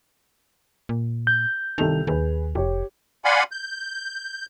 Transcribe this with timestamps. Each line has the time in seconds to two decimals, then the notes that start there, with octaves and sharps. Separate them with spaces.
0.89 A#2
1.27 G6
1.78 C2 D#3 A4 F7
2.07 D#2 G#4 B4
2.55 F1 G4 C#5
3.25 D5 F5 F#5 G#5 B5 C6
3.52 G6